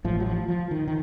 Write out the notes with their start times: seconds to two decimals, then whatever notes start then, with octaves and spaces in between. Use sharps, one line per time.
0.04 A1 A2 F3
0.20 F#3
0.27 F3
0.48 F3
0.71 D#3
0.88 D#3